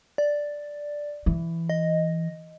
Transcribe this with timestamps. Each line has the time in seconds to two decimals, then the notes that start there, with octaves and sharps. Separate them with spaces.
0.18 D5
1.26 E3
1.70 D#5